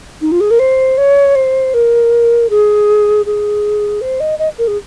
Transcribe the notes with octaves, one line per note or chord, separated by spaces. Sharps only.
D#4
F4
G#4
A#4
C5
C#5
C5
A#4
G#4
G#4
C5
D#5
D#5
A#4
G#4